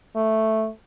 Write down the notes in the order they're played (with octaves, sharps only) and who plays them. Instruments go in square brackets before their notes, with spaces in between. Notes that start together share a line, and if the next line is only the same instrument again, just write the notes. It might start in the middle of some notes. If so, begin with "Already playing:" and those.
[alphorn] A3